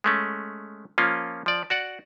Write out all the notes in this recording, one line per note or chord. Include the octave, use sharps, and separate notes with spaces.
G#3 A3 C#4
F3 A#3 C#4 F4
F3 D5
F#4 D5 F#5